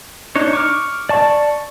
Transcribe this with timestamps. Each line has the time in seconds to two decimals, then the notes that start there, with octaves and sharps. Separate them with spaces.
0.36 D4 D#4 C#5
0.53 C#6 D6 F6
1.09 D5 A5 C#6